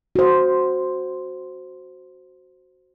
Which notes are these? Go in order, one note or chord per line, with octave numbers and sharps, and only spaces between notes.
F#4 C5